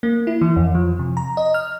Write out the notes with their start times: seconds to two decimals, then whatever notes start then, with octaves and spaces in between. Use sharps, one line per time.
0.03 A#3
0.27 E4
0.41 E3
0.56 F2
0.75 F3
0.99 C3
1.17 A#5
1.37 D#5
1.54 F6